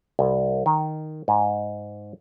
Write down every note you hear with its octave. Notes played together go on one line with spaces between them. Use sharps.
C2
D#3
G#2